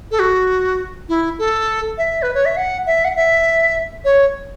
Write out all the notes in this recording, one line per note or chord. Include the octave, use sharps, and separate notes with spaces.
A4
F#4
E4
A4
E5
B4
C#5
E5
F#5
E5
F#5
E5
C#5